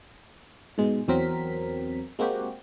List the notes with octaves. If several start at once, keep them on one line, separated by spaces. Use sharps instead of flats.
G#2 B2 G#3
E2 F#3 C4 A#4 B6
G#3 A#3 C4 F#4 G4